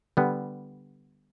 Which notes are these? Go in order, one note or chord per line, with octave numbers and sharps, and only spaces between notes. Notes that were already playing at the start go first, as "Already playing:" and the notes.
D3 G3 B3